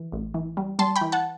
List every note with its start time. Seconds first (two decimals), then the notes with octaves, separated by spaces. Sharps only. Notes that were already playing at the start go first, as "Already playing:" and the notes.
Already playing: E3
0.12 A1
0.34 E3
0.57 G3
0.79 G3 A5 C6
0.96 G5 B5
1.01 E3
1.12 F#5 A5